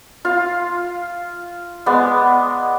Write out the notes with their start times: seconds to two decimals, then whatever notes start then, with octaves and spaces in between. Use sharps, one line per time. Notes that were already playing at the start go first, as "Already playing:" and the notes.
0.25 F4 F5
1.86 G#3 B3 D5